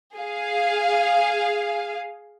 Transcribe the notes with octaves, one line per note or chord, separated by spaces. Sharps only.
G#4 F5